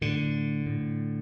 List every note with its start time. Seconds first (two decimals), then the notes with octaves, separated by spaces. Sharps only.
0.01 A2 D3
0.66 A2